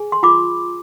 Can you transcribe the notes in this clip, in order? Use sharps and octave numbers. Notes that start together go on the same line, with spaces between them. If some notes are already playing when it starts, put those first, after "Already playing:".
Already playing: G#4 G#5
C6
F4 B5 D6